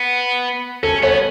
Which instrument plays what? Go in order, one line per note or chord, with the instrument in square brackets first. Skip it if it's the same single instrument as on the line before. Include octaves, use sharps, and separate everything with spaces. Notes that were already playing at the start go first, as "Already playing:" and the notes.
Already playing: [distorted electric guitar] B3
[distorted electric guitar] C#4 [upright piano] A4
[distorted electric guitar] B3 [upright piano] C#5